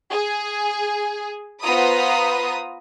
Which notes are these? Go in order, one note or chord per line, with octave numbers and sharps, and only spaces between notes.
G#4
B3 F4 C5 A#5 B5 D#6